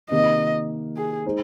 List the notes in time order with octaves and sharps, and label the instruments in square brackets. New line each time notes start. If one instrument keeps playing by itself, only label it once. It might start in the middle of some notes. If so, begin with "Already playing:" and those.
[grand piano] C3 D#3 A#3 [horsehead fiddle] D#5
[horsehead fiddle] G#4
[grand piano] G#3 D#4 C5